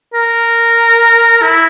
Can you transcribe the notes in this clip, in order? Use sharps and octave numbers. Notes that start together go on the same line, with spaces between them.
A#4
E4